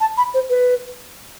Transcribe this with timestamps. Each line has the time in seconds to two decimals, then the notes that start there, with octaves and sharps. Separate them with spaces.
0.01 A5
0.17 B5
0.34 C5
0.50 B4